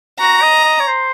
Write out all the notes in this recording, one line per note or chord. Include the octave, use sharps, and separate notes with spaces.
F#4 A#5
D#5
D#5
C#5
C5